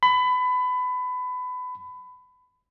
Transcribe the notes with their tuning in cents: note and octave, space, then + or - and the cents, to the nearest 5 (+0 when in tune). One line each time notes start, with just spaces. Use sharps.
B5 +25